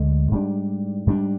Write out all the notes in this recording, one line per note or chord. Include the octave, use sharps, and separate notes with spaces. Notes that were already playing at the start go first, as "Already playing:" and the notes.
Already playing: D2 D3 G#3
G#2 G3 D4
G#2 G3 D4